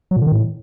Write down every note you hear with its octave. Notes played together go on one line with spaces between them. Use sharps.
F#3
A#2
D3
D#3
A2